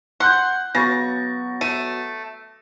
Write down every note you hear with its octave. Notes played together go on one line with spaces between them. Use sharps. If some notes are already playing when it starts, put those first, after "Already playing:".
F#5 C6 F#6 G6
C#3 F#3 B3 C#6 A6 A#6
A3 D#7